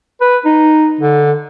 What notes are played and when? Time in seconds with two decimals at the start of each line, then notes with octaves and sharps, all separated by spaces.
0.21 B4
0.45 D#4
1.01 D3